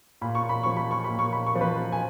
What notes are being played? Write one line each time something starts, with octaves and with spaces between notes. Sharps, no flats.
A#2 B5
C#6
B5
F3 C#6
B5
C#6
B5
A#2
C#6
B5
C#6
F3
B4 B5
G#5